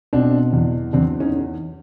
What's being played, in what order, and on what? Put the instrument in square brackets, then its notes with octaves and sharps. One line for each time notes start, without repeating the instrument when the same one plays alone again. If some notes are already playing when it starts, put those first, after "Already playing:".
[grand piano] B2 C4 D4
E2
E2 C4 D4
C#4 D#4